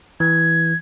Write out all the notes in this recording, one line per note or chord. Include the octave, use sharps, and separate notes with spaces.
E3 G#6